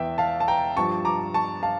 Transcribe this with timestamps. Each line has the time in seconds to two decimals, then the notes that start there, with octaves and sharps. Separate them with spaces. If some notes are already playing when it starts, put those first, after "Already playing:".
Already playing: E2 E3 E5 G5
0.18 F5 A5
0.40 A5
0.48 G5 A#5
0.76 G2 F3 A5 C#6
1.05 A#5 D6
1.34 A5 C#6
1.63 F5 A5